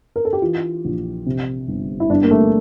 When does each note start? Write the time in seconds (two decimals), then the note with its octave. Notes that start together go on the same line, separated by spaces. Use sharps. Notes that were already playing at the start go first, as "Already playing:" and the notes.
0.16 A#4
0.25 A4
0.33 G4
0.42 E3 F4
0.85 A#1
1.26 C3
1.68 G1
2.00 E4
2.10 G2 D4
2.23 A#3
2.31 A3